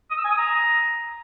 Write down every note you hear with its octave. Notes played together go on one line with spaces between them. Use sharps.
D#6
E6
G#5
D#6
A#5